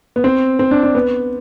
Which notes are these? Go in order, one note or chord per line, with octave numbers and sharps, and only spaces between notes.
B3
C4
C4
D4
D4
B3